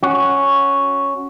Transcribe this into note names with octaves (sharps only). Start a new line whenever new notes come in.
C#4 F#4